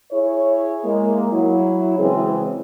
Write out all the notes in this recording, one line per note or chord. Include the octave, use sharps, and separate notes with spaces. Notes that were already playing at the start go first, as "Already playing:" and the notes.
E4 G#4 C#5
G#3 A#3
F#3 E4
C#3 E3 G#3 C4 G#4